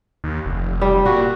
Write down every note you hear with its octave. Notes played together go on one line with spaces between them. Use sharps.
D#2
F1
G3
A#2 F#4